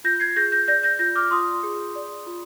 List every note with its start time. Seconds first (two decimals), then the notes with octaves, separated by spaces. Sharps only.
0.04 F4 G6 A#6
0.20 G#6 C7
0.36 G#4 G6 A#6
0.52 G6 A#6
0.68 D5 G6 A#6
0.83 G6 A#6
0.99 F4 G6 A#6
1.15 D6 F6
1.31 F4 C6 D#6
1.63 G#4
1.96 D5
2.26 F4